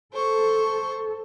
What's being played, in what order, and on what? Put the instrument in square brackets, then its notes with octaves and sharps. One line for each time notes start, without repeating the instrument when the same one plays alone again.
[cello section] A4 [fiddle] C5 C#6